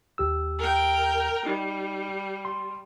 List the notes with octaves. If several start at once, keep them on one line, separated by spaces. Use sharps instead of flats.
D#2 G4 E6
A#4 G5
G3 D#4
C6